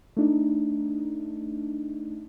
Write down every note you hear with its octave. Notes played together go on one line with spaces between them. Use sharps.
A3 D4 D#4